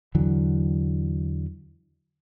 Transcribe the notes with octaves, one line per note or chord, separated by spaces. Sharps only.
E2 D3 E3 F#3